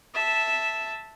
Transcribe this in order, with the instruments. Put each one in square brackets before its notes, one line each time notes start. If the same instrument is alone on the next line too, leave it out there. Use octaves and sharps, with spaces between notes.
[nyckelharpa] E5 A5